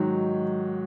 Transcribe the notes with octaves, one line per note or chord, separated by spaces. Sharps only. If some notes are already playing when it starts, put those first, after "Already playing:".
Already playing: G#2 D#3 F#3